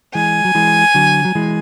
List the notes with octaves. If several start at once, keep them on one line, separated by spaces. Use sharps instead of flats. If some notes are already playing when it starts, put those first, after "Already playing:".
E3 G#3 G#5
F#3
E3 G#3
D3 F#3
F#3
E3 G#3